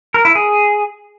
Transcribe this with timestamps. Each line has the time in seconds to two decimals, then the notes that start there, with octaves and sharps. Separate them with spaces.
0.14 A#4
0.25 E4
0.35 G#4